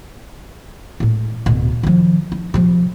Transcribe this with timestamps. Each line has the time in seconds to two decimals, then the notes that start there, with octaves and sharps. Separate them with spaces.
1.00 A2 G#3
1.46 D1 B2
1.83 D#3 F3
2.32 D#4
2.54 C3 F3